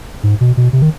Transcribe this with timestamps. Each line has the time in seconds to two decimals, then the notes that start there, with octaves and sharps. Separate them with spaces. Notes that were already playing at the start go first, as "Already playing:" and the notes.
0.23 G#2
0.41 B2
0.57 B2
0.73 C3
0.82 D#3